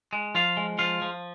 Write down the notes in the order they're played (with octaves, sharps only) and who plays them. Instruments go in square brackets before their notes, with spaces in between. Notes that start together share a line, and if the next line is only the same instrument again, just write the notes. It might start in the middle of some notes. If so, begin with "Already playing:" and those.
[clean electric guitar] G#3
F3 F4 F5
G#3
F3 F4 F5
F3